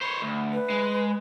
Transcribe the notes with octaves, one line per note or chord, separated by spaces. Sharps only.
C5 C#5 B5
D2
B4
G#3